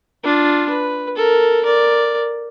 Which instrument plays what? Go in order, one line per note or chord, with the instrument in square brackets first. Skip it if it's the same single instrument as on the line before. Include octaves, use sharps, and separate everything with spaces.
[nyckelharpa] D4 F4
B4
A4 A#4
A#4 D5